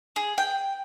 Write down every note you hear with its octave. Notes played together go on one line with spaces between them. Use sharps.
G#4
G5